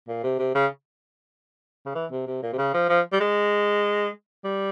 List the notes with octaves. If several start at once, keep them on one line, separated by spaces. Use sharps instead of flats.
A#2
C3
C3
C#3
C#3
E3
C3
C3
A#2
C3
C#3
F3
F3
G3
G#3
G3